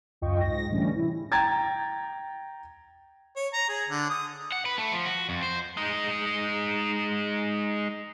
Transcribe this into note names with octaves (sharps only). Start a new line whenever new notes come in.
C#2 F#2 F4 D#5 G5 C#6
G#2 A#6
A2 D3 E3 G3 C#4
C3 E4
G5 A#5 G#6 A6
C#5
A#5
G#4
D3
D#6
F#5
B4
A3
F3
F#4
F2
C5
G#3 D#4